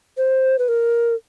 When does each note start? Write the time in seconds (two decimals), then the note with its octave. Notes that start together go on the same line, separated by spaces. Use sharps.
0.17 C5
0.59 B4
0.68 A#4